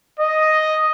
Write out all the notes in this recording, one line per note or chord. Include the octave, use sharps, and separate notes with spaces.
D#5